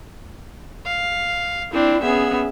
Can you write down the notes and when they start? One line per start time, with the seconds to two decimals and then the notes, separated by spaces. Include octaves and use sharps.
0.85 F5
1.73 C4 D4 E4
2.02 B3 C#4 G#4 E5